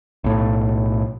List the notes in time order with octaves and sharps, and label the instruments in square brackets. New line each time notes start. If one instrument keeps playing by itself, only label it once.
[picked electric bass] B1 A2